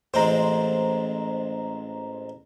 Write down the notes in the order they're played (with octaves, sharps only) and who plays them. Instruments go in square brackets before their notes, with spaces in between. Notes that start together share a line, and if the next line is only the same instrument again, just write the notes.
[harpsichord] A1 G#3 C4 [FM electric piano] C5 A#5